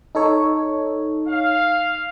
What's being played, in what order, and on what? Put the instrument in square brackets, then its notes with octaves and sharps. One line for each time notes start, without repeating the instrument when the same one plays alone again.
[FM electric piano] D#4 A4 C#5
[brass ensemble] F5